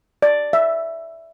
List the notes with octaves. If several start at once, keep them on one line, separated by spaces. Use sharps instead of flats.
D5
E5